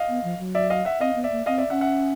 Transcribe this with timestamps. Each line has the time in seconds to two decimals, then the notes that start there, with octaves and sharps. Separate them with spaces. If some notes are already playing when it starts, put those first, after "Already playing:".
Already playing: D#5 F5
0.09 B3
0.24 F3
0.39 F#3
0.55 D5 E5
0.70 D#5 F5
0.85 E5 F#5
1.00 C4 D#5 F5
1.16 B3
1.24 D5 E5
1.32 A#3
1.46 C4 D#5 F5
1.58 D5 E5
1.70 C#4 E5 F#5
1.81 E5 F#5